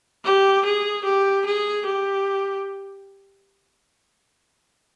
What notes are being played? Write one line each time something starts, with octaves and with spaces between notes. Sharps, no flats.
G4
G#4
G4
G#4
G4